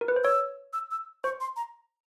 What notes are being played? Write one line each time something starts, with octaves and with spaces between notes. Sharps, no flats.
A#4
B4
C5
C#5 E6
E6
E6
C5 C#6
C6
A#5